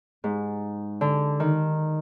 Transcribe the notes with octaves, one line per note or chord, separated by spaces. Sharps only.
G#2
D3
D#3